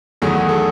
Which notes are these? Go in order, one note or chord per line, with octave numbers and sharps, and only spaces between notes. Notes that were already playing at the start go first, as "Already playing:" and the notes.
E2 D#3 F#3 A3 G#4
F#4
A4